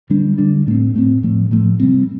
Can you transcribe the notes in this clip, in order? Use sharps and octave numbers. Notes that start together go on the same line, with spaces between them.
D3 G3 D4
D3 G3 D4
A2 A3 C4
A2 A3 C4
A2 F3 A3
A2 F3 A3
C3 G3 C4